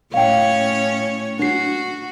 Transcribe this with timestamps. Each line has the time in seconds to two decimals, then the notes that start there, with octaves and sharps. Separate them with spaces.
0.14 A2 C#4 C#5 F5 G5
1.39 D4 F#4 C7